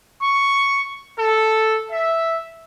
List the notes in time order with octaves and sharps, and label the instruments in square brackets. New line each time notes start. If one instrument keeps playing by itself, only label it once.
[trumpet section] C#6
A4
E5